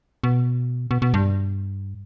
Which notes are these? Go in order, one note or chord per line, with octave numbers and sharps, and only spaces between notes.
B2
B2
B2
G2